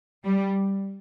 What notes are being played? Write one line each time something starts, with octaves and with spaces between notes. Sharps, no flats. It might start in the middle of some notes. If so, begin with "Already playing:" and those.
G3